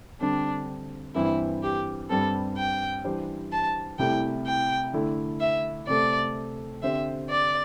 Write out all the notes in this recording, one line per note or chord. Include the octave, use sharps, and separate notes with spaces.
D3 G3 C4 D4
G2 E3 C4 E4
G4
G2 G3 C4 A4
G5
E3 G3 D4 G4 C5
A5
C2 C3 A3 E4 G4 G5
G5
D3 A3 E4
E5
C3 A3 C4 A4 D5
D3 C4 G4 C5 E5
D5